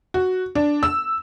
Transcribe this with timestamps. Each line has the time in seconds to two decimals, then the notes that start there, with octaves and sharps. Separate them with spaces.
0.14 F#4
0.55 D4
0.83 E6